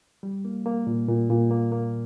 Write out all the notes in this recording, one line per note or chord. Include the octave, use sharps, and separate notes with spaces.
G3
A#3
A#3
A#2
A#2
A#2
A#3
A#3